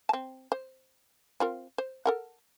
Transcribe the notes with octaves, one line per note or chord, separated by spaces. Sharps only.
C4 A5
C5
C4 F4 A#4
C5
A4 A#4 F#5